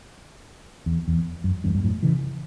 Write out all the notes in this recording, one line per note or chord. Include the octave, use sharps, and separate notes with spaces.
E2
E2
F#2
E2 G2
G2
F#2 A2
C#3 E3